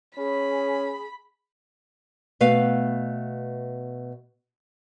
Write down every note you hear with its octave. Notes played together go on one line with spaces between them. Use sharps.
C#4 G#4 B5
B2 A3 B4 F5